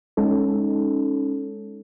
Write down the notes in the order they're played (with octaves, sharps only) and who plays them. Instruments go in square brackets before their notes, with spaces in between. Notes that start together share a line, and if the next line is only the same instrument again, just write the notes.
[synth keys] G#3 C#4 D#4 A4